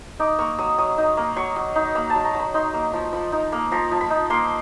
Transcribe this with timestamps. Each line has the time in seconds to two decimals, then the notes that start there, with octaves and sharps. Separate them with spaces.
0.19 D#4 D6
0.39 A#3 C#6
0.58 F#3 D#6
0.78 F#3 D#6
0.98 D#4
1.17 A#3
1.36 F#3 C#6
1.56 F#3
1.76 D#4
1.95 A#3 B5
2.10 A5
2.15 F#3
2.25 A#5
2.35 F#3 B5
2.54 D#4 C6
2.74 A#3
2.93 F3
3.13 F3 B5
3.32 D#4
3.52 A#3
3.72 F3 A#5
3.91 F3
4.01 B5
4.10 D#4
4.30 A#3 C6